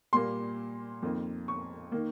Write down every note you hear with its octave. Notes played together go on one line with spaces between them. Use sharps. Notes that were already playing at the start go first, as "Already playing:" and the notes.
A#2 G3 A#3 C6
F2 D#3 A#3
C#6
D#3 A#3